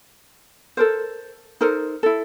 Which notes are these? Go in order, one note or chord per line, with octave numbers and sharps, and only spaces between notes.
A4 A#4 C5
D#4 A4 A#4 C5
E4 A4